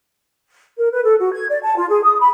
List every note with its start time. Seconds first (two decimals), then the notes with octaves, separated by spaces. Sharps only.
0.77 A#4
0.92 B4
1.03 A4
1.18 F#4
1.32 G#6
1.49 D5
1.63 A5
1.77 F4
1.89 G#4
2.03 D#6
2.19 B5